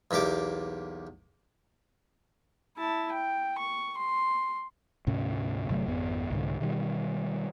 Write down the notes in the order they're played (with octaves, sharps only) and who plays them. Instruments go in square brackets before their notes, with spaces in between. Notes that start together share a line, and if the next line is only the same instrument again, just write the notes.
[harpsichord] B1 E2 A#3 G4 D6
[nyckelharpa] E4 A5
G5
C#6
C6
[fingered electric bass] D2 G#2 C3 C#4
G1 C3 F#3 A3
G#1 F2 B3
C2 G#2 D3
B2 D#3 F3 G3